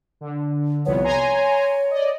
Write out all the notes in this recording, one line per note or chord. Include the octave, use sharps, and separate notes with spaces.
D3
C2 F2 B3 C#5
G#5 A#5 C6
D5 D#5